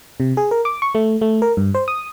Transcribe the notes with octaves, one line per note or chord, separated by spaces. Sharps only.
C3
G#4
A#4
D6
C#6
A3
A3
A#4
G2
C5
D#6